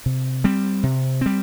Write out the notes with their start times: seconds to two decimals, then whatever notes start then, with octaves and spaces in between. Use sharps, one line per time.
0.06 C3
0.44 G3 C4
0.83 C3
1.21 G3 C4